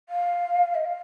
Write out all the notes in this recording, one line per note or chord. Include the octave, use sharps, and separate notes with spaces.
F5
D#5
F5